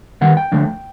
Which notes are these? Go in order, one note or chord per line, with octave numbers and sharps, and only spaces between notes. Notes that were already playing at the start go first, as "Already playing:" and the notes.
D#3 G3 B3 F#5
G5
D3 F3 A3 D4